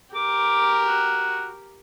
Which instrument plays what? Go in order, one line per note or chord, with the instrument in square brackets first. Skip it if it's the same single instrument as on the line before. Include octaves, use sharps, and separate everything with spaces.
[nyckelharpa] G4 A#4 [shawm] D6
[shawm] F#4